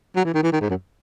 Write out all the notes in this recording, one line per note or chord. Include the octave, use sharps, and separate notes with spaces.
F#3
E3
D#3
E3
D#3
G#2
F#2